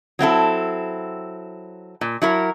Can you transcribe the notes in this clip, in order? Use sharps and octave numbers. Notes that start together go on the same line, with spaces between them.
F#3 C4 E4 A4
A#2
F#3 E4 A#4